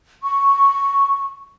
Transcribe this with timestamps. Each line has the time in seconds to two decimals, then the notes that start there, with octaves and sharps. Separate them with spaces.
0.23 C#6